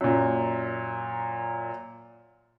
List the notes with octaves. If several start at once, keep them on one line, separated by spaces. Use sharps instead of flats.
F#2 A#2